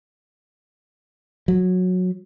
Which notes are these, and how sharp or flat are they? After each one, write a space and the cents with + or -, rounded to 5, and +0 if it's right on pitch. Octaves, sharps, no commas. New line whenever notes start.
F#3 -15